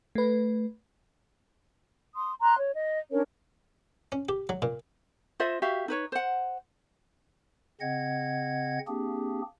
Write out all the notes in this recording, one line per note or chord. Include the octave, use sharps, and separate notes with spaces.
A3 B4
C6 D#6
A#5 C6 F#6
C#5
D#5
C#4 D4 A#4 C#5
C#4
G4
F#3
A#2
F4 C5 D#5 E5
F#4 G4 E5 F5
D#4 B4 C#5
C5 F#5
C#3 C4 D#5 F#5 G#6
A#3 C4 D4 G4 G#4